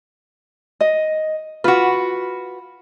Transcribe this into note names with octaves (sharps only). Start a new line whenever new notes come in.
D#5
F4 F#4 B4